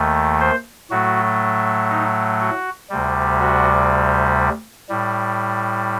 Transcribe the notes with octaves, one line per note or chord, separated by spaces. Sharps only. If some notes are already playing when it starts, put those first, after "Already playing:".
Already playing: D#2 D#3 A3
C5
A2 F#3 A3 F#4
D#4
F#4
D2 C3 G3
F#4
A2 G3